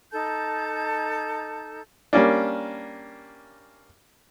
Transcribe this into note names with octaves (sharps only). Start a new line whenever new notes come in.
D#4 A4 A5 G6
G3 A#3 C#4 D4